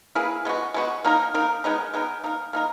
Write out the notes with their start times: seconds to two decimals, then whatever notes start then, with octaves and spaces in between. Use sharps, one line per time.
0.15 A#3 E4 G#4 B4
0.45 G#3 B3 F#4
0.74 G#3 B3 F#4
1.05 A#3 D#4 A#4
1.34 A#3 D#4 A#4
1.64 G#3 B3 D#4 A#4
1.93 G#3 B3 D#4 A#4
2.23 A#3 D#4 A#4
2.53 A#3 D#4 A#4